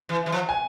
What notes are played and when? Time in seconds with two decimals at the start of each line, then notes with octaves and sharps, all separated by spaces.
0.09 E3
0.26 E3
0.32 F3
0.49 G#5